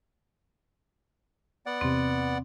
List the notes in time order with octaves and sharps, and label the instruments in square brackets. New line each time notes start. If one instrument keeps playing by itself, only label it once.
[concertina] B3 D5 F#5
[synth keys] E2 C3 [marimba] C4